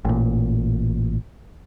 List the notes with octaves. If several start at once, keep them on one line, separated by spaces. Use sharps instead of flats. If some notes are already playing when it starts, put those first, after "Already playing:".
A1 A#2